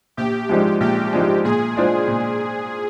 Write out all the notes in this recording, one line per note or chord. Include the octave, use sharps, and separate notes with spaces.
A#1 G4
G#2 F3 G#3 D4
A#1 G4
G#2 F3 G#3 D4
A#2 G#4
G#3 D4 F4 C5
A#2